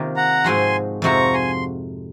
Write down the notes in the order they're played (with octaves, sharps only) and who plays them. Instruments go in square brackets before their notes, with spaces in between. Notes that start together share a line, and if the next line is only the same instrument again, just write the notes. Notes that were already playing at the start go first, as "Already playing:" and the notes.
Already playing: [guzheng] C3 D#3 A#3 F4
[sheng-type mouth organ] F#5 A#5
[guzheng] G#2 F3 G#3 C4 F#4 [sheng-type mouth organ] G#5 C6
[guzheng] F2 C3 F3 C4 F#4 [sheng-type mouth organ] A#5 C#6
[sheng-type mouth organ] G#5 C6